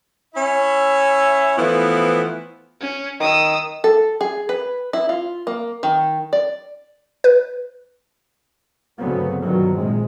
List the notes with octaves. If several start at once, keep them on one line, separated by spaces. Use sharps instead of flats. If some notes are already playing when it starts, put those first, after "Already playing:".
C#4 E4 E5
E3 F3 A3 B3 E4
C#4
D#3 D#6 E6
A4
G#4
B4
E4
F4
A#3
D#3
D5
B4
D2 G2 C#3 F#3 B3 C4
G2 B2 D#3 F3 F#3
A#1 C3 G#3